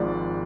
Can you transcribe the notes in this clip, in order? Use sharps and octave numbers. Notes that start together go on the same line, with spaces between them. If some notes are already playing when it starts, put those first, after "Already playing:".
Already playing: G#1 G#2 F3 D5